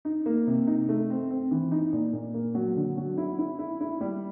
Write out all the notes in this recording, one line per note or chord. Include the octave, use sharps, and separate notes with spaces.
D#4
A#3
C3
D#4
A3
C4
C4
E3
D#4
A#2
A#2
A#3
F#3
D3
F#3
E4
E4
E4
E4
G3